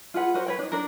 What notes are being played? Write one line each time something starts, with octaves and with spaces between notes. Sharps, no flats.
F4 G#4 B4 F#5
F#4 A#4 C5
B4 C#5 G5
D4 D#4
D4 A#4